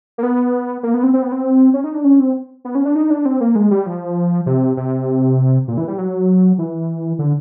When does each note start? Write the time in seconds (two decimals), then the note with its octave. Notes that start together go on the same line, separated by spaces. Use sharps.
0.18 A#3
0.23 B3
0.83 A#3
0.94 B3
1.03 C4
1.13 C4
1.23 B3
1.32 C4
1.74 C#4
1.84 D#4
1.94 D4
2.04 C#4
2.20 C4
2.65 B3
2.75 C#4
2.85 D4
2.95 D#4
3.10 D4
3.25 C4
3.41 A#3
3.56 G#3
3.71 G3
3.86 F3
4.46 C3
4.77 C3
5.68 A#2
5.77 E3
5.88 G3
5.98 F#3
6.58 E3
7.19 D3